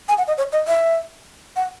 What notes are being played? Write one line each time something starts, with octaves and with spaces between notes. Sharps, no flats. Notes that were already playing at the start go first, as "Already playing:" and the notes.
G#5
F#5
D#5
C#5
D#5
E5
F#5